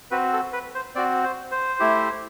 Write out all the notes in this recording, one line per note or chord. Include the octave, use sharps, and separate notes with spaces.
C4 F#4 B4
A4
B4
C5
C4 F#4 D5
C5
C5
A3 E4 G4